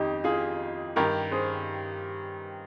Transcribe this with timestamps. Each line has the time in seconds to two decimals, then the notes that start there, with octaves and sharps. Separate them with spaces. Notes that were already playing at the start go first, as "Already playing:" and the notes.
Already playing: F2 D#3 D#4 G4
0.24 F4 G#4
0.96 G2 D#3 G4 A#4
1.32 G#4 C5